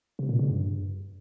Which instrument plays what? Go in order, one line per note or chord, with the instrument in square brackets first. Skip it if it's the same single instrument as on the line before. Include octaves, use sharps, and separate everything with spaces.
[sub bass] C3
A#2
C#3
G2